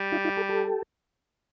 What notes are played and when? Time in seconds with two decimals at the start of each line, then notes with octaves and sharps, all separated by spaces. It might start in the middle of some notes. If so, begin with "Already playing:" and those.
Already playing: G3
0.12 D#4 F4
0.24 D#4 F4
0.37 G4 A4
0.49 G4 A4